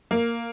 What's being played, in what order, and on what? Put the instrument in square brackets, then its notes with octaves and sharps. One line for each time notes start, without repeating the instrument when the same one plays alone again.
[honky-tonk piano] A#3